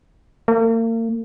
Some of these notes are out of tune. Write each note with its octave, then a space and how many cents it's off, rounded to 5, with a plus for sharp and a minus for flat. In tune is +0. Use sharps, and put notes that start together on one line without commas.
A#3 -40